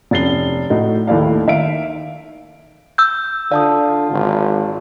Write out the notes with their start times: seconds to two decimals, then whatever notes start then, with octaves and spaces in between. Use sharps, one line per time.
0.11 F1 C#4 A6 C7 G7
0.70 A2 D#4 F#4
1.07 D#2 A3 E4 D5 F5
1.47 D#3 E5 F5 D7
2.98 E6 G6
3.52 D3 F4 D5 F5 A5 D#6
4.12 G#1